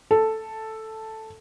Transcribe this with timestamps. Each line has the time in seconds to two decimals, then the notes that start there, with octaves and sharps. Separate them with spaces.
0.11 A4